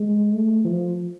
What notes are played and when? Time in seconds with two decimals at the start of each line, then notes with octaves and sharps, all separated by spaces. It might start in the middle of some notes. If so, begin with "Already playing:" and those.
Already playing: G#3
0.33 A3
0.65 F3